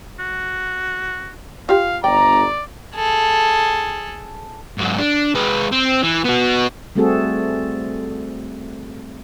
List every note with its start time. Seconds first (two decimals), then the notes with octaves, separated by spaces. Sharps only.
0.19 F#4
1.69 F4 G4 F5
2.04 G1 D5 G5 A#5
2.95 G#4 A4
4.78 G#2 F#3
4.99 D4
5.35 G#3 B4
5.72 C4
6.03 E3
6.25 B3 F#4
6.95 G3 A3 C4 F#4 G#4 A4